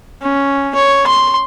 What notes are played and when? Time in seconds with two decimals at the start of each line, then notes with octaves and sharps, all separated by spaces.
0.22 C#4
0.74 C#5
1.07 C6